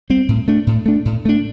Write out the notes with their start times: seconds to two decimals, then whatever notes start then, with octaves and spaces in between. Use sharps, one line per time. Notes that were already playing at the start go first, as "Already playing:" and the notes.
0.10 G3 C4
0.29 A2
0.48 A3 D4
0.67 A2
0.86 A3 D4
1.05 A2
1.25 A3 D4